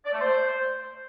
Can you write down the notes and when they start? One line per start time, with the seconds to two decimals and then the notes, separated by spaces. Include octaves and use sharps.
0.05 D5
0.13 A3
0.21 C5